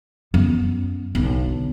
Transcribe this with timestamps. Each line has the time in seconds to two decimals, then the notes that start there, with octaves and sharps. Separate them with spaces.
0.34 F#2 B3
1.15 B1 D3